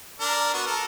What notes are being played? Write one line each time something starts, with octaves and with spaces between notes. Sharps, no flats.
D4 A#4
B3 F#4
A4 A#4